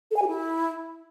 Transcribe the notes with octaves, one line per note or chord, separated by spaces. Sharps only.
A4
G#5
G4
E4